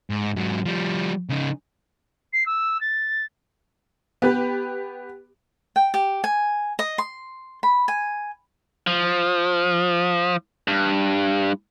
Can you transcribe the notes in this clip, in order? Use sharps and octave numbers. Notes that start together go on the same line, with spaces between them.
G#2
G#2 F#3
F3 G3
C#3 D#4
C7
E6
A6
B3 G4 B4
G5
G4
G#5
D#5
C6
B5
G#5
F3
G2